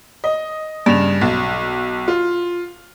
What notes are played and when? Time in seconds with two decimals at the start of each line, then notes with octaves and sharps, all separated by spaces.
0.24 D#5
0.86 G2 C#3 E7 F7
1.21 B1
2.08 F4